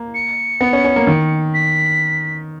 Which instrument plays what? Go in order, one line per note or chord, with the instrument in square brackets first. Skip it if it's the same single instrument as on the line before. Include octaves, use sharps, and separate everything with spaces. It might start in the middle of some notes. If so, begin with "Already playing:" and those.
Already playing: [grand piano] A#3
[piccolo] C#7
[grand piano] B3
C#4
C#4
A#3
D#3
[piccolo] B6